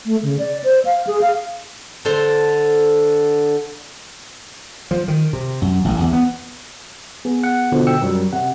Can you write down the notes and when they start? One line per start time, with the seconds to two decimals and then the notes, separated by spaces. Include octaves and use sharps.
0.06 A3
0.23 C#3
0.39 D5
0.64 C5
0.85 F5
1.07 G#4
1.21 F5
2.05 D3 A4 C5
4.91 F3
5.08 D#3
5.33 C3
5.62 F#2
5.85 A1
6.00 E2
6.13 B3
7.25 B3 G#4
7.43 F#5
7.72 B2 D3 F3
7.87 G5 E6 C#7
8.02 F#2 F#3 G3 A#4
8.33 C3 F#5